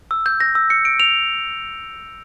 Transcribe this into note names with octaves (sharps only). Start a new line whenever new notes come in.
E6
G6
A#6
E6
C#7
D7
F7